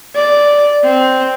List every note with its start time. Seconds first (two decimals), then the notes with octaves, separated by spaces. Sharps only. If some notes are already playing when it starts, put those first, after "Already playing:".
0.16 D5
0.84 C4